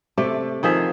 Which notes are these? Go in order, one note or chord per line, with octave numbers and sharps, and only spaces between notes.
C3 A3 D5
D#3 F3 G#4 E5